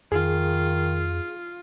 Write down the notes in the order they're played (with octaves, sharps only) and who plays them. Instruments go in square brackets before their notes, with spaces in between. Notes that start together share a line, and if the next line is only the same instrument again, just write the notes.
[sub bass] F2 [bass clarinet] D#3 [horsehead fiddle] F4 [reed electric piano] G#4